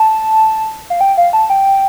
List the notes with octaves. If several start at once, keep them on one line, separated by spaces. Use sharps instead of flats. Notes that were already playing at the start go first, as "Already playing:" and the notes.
Already playing: A5
F5
G5
F5
A5
G5